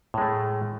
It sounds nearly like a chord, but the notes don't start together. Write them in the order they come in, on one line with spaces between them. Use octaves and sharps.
A2 G#3 A3